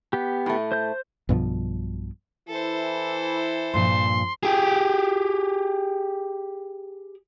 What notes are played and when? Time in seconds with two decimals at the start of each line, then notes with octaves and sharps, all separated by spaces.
0.13 B3 G4
0.46 A2 A3
0.72 C5 G6
1.29 B1 G2 B2 F3
2.48 E3 E4 A4 C5
3.74 G2 A#2 F3 C6
4.43 G4 G#4